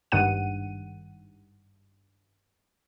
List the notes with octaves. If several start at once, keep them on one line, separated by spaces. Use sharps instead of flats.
G#1 G2 D#3 F#5 D#7